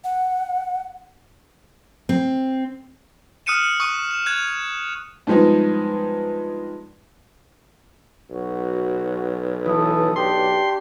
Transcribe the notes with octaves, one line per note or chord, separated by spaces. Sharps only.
F#5
C4
D#6 F6 F#6 C#7 D#7 E7
C#6 D#6 F#6 D#7
E7
F#6 G#6 F7
G2 F3 G#3 B3 D#4
B1 F#4
E3 A4 D#6
D4 G4 C6